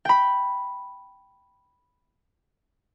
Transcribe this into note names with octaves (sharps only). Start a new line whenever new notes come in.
G5 B5